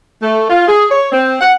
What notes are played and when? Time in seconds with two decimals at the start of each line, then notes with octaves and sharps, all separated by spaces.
0.22 A3
0.50 F4
0.68 G#4
0.90 C#5
1.12 C4
1.40 F#5